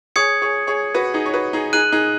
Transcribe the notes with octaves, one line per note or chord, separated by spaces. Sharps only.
G#4 C#5 D#6 G#6 C#7
G#4 C#5
G#4 C#5
F#4 B4
D#4 G#4
C#5
F#4 B4
D#4 G#4
D#4 G#4 F#6 D#7 F#7
D#4 G#4